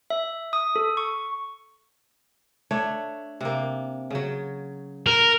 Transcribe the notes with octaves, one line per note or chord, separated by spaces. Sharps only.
E5
D#6
A4
C#6
A3 D4 C#5
C3 A#3
C#3 F#3
A#4